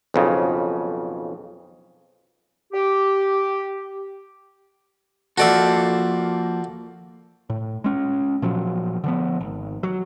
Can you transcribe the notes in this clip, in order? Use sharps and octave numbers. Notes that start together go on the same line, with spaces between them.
B1 F2 C#3
G4
F3 A#3 F#4 A4 D5 E5
A2
G#3 C#4
A#2 F3 F#3
D3 F3 B3
G#1
F#3